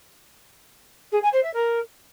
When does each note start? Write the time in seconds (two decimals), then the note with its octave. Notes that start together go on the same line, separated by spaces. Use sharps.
1.11 G#4
1.22 G#5
1.32 C5
1.43 E5
1.53 A#4